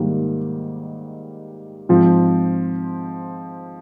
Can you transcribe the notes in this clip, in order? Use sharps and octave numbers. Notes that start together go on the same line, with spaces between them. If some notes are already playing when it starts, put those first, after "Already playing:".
Already playing: G#2 D#3 G3 A#3
G#2 F3 C4 F4